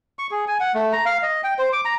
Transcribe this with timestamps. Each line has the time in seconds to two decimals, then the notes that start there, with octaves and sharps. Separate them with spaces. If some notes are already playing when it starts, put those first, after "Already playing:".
0.19 C#6
0.31 G#4
0.48 G#5
0.60 F#5
0.75 A3
0.93 A#5
1.06 F5
1.23 D#5
1.44 G5
1.59 C5
1.73 D6
1.85 A#5